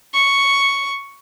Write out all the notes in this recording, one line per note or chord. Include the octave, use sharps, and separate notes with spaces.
C#6